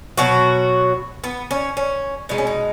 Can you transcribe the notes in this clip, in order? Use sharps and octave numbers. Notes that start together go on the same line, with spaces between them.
B2 F#3 F#4
B3
C#4
C#4
B2 G#3 D#4
C#4
D#4